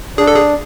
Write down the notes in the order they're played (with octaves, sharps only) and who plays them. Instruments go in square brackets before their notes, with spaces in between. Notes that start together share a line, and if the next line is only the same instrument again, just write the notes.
[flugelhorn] D4 [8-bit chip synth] G#4
[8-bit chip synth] A4
G#4